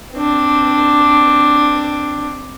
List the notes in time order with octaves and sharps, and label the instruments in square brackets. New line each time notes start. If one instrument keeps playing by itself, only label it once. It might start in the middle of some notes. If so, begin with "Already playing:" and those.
[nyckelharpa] C4 D4